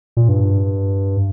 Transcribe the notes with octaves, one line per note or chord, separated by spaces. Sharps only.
A#2
G2